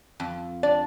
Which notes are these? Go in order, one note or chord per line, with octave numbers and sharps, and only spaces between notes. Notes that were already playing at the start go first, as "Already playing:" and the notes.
F2
D4 D5